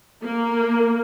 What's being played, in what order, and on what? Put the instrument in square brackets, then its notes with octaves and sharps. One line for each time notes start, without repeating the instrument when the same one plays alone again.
[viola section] A#3